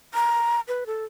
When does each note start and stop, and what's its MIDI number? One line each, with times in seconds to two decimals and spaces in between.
0.14 0.60 82
0.68 0.84 71
0.86 1.05 69